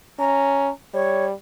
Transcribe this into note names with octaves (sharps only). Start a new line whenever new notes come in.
C#4 A#5
G3 C#5